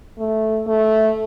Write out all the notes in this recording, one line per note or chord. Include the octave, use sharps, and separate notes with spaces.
A3
A3